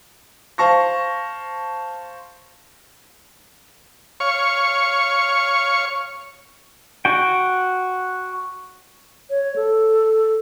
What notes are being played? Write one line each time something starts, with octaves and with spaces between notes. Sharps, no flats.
C5 F5 A5 C#6 A#6
C#5 F5 C#6
F#4 G5
C#5
A4